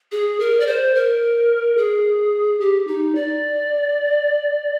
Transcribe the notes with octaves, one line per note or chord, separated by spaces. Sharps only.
G#4
A#4
D5
C5
A#4
G#4
G4
D#4
D5